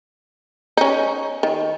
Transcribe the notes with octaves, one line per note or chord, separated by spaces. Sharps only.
C#4 D#4
D#3